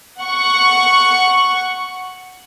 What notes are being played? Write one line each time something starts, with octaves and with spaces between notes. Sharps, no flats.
F#5 C#6